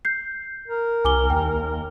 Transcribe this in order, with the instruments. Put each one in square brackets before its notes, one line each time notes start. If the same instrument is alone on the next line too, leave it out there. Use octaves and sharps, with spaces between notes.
[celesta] G6 C7
[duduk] A#4
[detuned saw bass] C2 [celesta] G#5 D6 G7
[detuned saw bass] D#2 [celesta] G5